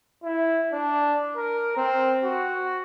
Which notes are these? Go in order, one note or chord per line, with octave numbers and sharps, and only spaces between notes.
E4
D4
A#4
C4
F#4